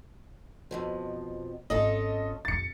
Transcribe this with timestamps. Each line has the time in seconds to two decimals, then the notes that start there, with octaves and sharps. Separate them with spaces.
0.71 F2 B2 F3
1.70 G#1 C#4 F4 A4 D#5
2.45 A#1 F2 A6 C#7